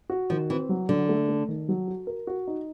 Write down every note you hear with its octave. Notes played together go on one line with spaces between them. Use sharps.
F#4
D#3 F3
E3 C4
F#3
D3 F#3
A3
A3
D#3
F#3
F#4
A#4
F#4
D#4